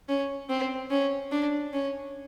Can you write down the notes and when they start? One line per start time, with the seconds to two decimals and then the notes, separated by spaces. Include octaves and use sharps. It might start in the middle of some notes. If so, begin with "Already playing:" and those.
0.09 C#4
0.49 C4
0.91 C#4
1.31 D4
1.73 C#4